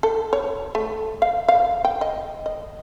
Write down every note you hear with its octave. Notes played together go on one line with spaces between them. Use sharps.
A4
C#5
A3
F5
F5
G5
D#5
D#5